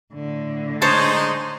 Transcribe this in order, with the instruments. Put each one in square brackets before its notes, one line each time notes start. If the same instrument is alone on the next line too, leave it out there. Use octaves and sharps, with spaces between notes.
[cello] A2 D3
[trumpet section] G#3 D#4 [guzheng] C5 C#5 A5